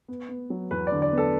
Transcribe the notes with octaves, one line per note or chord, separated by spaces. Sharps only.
B3
B3
F#3
E2 B4
D3 D5
D5
B3 A4